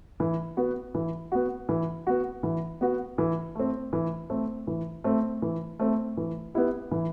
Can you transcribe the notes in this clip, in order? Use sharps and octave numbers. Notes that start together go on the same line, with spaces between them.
E3
B3 F#4
E3
B3 F#4
E3
B3 F#4
E3
B3 F#4
E3
A3 C4
E3
A3 C4
E3
A3 C4
E3
A3 C4
E3
B3 E4 G4
E3